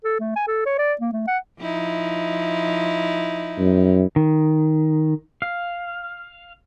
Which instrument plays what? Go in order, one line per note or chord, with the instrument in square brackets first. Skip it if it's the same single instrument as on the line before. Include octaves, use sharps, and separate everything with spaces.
[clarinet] A4
A3
G#5
A4
C#5
D5
A#3
A3
F#5
[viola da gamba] F3 D#4 E4
[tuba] F#2
[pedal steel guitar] D#3
F5